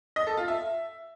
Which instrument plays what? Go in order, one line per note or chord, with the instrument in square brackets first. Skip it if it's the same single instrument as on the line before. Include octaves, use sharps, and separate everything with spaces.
[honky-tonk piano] D#5
A4
F4
E5